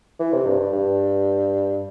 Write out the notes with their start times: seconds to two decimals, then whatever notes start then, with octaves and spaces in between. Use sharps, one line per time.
0.20 E3
0.33 C3
0.46 G2
0.60 G2
0.73 G2